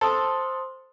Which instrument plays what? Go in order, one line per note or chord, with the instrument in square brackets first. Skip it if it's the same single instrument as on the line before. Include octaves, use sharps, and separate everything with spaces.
[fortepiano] A4 [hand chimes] C5 C6 D#6